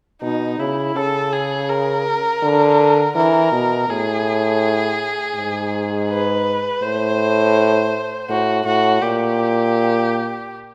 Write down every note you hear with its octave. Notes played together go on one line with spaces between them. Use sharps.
B2 D#4
C#3 E4
C#3 A4
G#4
A#4
D3
E3 A#4
B2
A2 G#4
G#2
B4
A2 C5
A2 F#4
A2 F#4
A#2 G4